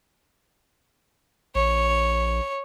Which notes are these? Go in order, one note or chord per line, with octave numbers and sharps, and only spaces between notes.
A#1 C#5